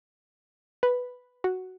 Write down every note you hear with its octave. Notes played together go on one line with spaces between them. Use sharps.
B4
F#4